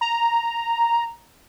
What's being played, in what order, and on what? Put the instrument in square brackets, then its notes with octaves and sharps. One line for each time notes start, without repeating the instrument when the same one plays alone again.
[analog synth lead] A#5